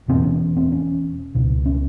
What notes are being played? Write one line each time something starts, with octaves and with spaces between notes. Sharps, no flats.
E1 E2 B2 C4
C#4
C4
C#4
C#2 B2
C#4